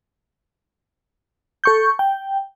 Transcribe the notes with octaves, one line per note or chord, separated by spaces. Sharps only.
A4 C#6 G6
G5